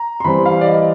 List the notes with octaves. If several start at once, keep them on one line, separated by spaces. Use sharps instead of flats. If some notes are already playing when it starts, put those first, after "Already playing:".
Already playing: A#5
C6
E3 G3 C4 B5
F5
D5
D#5